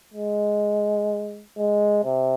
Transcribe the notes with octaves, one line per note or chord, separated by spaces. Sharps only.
G#3
G#3
C3